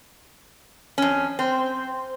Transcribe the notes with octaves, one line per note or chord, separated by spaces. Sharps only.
F2 C#4
C4 C5